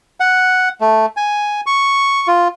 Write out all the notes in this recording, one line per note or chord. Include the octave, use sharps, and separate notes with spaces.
F#5
A3
G#5
C#6
F4